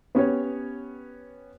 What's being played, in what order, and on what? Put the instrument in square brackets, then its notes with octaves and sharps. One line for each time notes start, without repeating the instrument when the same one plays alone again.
[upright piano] B3 C#4 G4 C#5